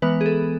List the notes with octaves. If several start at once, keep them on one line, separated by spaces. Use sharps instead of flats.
E3 G#3 B3 B4
G#4
A4